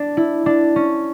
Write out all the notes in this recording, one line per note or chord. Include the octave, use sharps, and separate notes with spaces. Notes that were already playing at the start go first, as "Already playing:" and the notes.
Already playing: D4
E4
D4
C#4